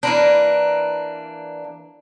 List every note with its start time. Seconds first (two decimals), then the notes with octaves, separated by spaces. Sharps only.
0.03 E3 A#3 D4